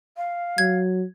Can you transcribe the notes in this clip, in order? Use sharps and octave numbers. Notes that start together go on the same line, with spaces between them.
F5
F#3 G#6